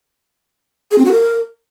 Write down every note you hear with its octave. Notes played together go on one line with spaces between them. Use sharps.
G#4
C4
F#4
A#4